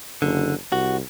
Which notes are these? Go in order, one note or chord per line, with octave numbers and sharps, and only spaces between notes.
F#1 D3
C2 F#4